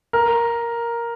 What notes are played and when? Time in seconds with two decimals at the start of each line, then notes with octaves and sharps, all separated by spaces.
0.13 A#4